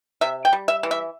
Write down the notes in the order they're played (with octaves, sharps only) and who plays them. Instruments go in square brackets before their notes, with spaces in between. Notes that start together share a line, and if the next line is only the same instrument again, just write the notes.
[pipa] C3 E5
G5
G3
E5
E3
E5